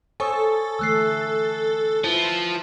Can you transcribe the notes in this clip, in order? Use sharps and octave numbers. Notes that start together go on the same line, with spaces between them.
A4 C5 C#5 G#5 C#6 D#6
D3 E3 A3 E6 F#6 C7
F3 E4 B4